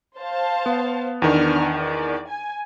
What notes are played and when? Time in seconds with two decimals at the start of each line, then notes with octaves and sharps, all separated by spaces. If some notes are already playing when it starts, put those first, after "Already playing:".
0.19 C5 F5 A5
0.66 B3
1.22 E2 D#3 B3 D4 F6
1.80 D5
2.28 G#5